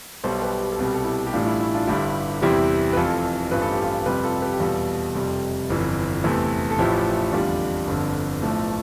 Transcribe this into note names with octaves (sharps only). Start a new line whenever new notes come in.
B1 B2 G3 A4 C5
G4 B4
G4
A4
C2 B2 G3 G4
A4
E4 G4
G4
A1 A2 G3 D4 F4
E4
E4
D4 F4
G1 G2 D3 G3 E4 G4
E2 C3 E3 G3 E4 G4
B4
F1 F2 E3 F4 A4
A1 G2 F3 B4
A4
G4
F4 A4
F2 C3 G3 G4 B4
F4 A4
G4 B4
G4
E2 B2 G3 F4 A4
F1 F2 C3 G3
G1 F2 E3
E2 C3 E3 A3
A4
A1 A2 F3 A3 E4 G4
F1 E2 D3 G3 D4 F4
G1 F2 D3
B1 A2 F3 A3